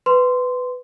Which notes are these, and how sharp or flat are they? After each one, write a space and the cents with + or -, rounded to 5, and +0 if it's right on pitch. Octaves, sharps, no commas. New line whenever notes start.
B4 +15 C6 -10